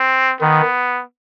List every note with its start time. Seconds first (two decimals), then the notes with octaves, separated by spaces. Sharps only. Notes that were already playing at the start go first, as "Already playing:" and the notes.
Already playing: C4
0.41 D#3 B3